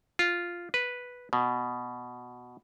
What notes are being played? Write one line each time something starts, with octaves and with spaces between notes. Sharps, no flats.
F4
B4
B2